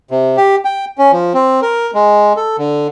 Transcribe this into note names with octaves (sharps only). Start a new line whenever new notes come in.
C3
G4
G5
C#4
F3
C4
A#4
G#3
A4
D3